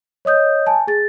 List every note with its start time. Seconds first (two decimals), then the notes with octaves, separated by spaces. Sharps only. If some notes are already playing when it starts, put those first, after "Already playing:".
0.25 C#5 D#5 D#6 G6
0.67 G#5 A5
0.87 G#4 A6